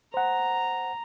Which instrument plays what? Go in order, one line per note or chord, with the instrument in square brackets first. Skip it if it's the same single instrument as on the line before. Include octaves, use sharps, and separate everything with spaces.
[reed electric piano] C5 F#5 [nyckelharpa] A#5